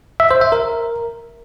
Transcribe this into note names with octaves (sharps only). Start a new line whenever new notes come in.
E5
C5
E5
A#4